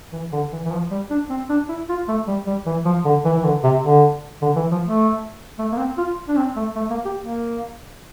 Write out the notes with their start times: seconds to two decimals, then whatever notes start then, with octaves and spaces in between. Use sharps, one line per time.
0.12 E3
0.32 D3
0.52 E3
0.65 E3
0.72 F3
0.91 G3
1.10 D4
1.29 C4
1.49 D4
1.68 E4
1.89 F4
2.08 A3
2.27 G3
2.47 G3
2.66 E3
2.85 F3
3.05 D3
3.25 E3
3.37 E3
3.44 D3
3.63 C3
3.83 D3
4.42 D3
4.56 E3
4.71 F3
4.85 A3
5.58 A3
5.72 A#3
5.78 C4
5.98 F4
6.28 D4
6.36 C4
6.56 A3
6.76 A3
6.90 A#3
7.05 G4
7.19 A#3